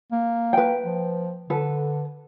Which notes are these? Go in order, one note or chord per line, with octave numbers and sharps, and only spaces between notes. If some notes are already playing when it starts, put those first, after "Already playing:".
A#3
B4 G5
F3
D3 A4 B4